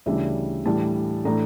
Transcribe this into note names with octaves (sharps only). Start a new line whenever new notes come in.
D2 C#3 E3 G3 D4 E5
A2 E3 G3 D4 A5
A2 E3 A3 D4 A#5